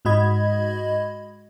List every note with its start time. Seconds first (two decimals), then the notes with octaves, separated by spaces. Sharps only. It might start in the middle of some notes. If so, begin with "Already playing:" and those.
0.05 G#2 G#3 F#4 D#5 B5 G#6